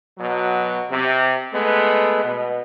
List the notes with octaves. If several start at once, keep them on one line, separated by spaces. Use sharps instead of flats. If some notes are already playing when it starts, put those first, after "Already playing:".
B2 F#3
C3
G#3 A3 B3
B2